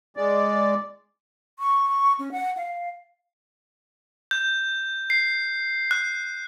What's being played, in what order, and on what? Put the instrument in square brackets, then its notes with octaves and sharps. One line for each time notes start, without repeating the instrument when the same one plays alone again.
[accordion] G#3 D5
[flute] C#6
C#4
F#5
F5
[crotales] G6
C7
F#6